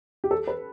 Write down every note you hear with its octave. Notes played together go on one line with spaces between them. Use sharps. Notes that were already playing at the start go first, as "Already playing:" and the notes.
G4
A4
B4